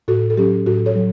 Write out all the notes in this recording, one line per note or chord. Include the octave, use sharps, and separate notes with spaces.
A2 F#4 A4
A4
F#3 C#4 G4
A2 F#4 A4
A4 C#5
F#3